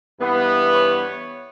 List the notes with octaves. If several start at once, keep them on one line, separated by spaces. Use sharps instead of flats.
G2 E3 B3
C#5